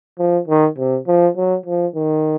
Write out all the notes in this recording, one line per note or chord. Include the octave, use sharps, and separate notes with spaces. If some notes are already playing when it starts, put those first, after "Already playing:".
F3
D#3
C3
F3
F#3
F3
D#3